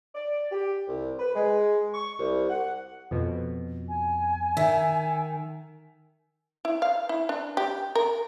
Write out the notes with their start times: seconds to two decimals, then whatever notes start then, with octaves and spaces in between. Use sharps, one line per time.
0.15 D5
0.51 G4
0.88 C2
1.20 B4
1.35 G#3
1.95 C#6
2.19 C2
2.50 F#5
3.11 F2 B2
3.89 G#5
4.57 D#3 E5
6.65 E4
6.82 F5
7.09 E4
7.29 D4
7.57 G4
7.95 A#4